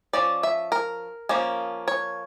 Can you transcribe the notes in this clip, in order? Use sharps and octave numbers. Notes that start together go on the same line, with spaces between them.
F3 C#4 D5
E5
A#4
F3 A#3 C#4
C#5